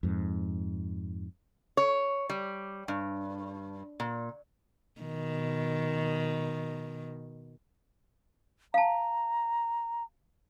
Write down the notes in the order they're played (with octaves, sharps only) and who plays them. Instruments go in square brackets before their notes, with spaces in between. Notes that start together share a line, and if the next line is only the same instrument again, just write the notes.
[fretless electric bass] F2 G#2
[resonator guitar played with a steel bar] C#5
G3
G2
A#2
[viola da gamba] B2 D#3
[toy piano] F5 A5 [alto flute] A#5